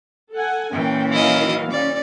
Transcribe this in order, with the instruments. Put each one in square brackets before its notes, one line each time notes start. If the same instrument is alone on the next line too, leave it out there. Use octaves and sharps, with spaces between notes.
[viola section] A4 F#5 G#5
[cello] A#2 E3 [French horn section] C#4 [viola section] A#4 G5
[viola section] D#3 F#3 F5 [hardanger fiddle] E4 D#5
[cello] C#4 [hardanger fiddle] D5